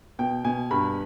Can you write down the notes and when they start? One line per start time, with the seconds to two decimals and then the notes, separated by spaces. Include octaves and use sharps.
0.19 B2 G5
0.45 B2 G#5
0.71 G2 B5